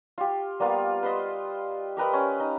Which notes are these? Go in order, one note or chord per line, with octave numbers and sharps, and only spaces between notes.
F4 G4
G3 A#3 B3 F4
B4 C5 D#5
G4 A#4 B4 D#5
C#4 D#5
D#4